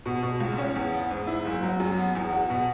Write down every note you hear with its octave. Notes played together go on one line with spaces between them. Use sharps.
B2
B2
C#2
C#4
E2
B3
G#2
E4
F#1
F#3
F#2
B3
E2
F#4
B2